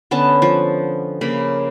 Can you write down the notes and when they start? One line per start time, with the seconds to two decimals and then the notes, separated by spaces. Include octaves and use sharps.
0.11 D3 B3 C#4 A5
0.42 F3
1.21 C#3 A#3 B5